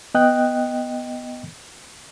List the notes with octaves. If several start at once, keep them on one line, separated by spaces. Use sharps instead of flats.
B3 D#5 G5 F#6